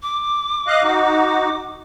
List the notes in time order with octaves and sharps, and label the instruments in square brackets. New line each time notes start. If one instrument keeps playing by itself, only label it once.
[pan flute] D6
[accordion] D#5 F5 F#6
D#4 F#4